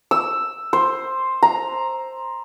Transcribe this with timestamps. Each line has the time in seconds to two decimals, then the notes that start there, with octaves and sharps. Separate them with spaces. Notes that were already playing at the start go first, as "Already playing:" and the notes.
0.11 E6
0.73 C5
1.43 A#5